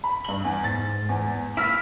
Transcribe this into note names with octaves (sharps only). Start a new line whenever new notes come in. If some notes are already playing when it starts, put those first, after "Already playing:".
B5
G2 F#7
E2
G#2 A6
E2
A#3 E4 E6 F6 B6